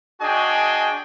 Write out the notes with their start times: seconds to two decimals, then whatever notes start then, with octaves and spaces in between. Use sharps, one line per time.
0.21 D4 F#4 G#4 D#5 G5 G#5